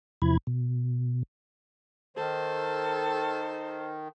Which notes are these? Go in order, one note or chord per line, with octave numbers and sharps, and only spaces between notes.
E2 C3 F3 E4 B5 G#6
B2
D#3 A4 C5